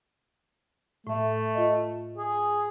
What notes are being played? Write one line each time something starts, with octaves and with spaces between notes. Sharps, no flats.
A2 A3 E5
F4 D#5
G#4